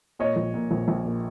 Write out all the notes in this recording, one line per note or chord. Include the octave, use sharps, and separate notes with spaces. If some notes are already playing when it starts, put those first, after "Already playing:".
A#2 C#5 D#5
A#1
A#2
A#1
A#1
A#2